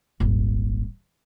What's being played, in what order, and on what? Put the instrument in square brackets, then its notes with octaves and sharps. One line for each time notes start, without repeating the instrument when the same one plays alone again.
[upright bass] D#1 G#1